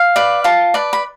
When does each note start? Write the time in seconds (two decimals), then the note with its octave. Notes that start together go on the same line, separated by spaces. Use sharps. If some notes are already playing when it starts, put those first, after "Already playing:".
Already playing: F5
0.16 B4 D5
0.44 F4 A5
0.74 B4 D5
0.93 B5